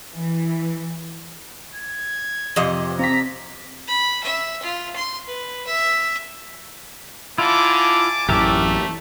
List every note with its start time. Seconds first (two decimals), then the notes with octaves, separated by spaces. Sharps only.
0.15 E3
1.75 G#6
2.56 F2 C3 D#5
2.99 C4 A#5 B6
3.88 B5
4.23 E5
4.62 F4
4.96 C6
5.27 B4
5.66 E5
7.38 D3 E4 F4 G#5 A5 D6
8.29 A1 F#2 E3 A3 G4 A#4 E5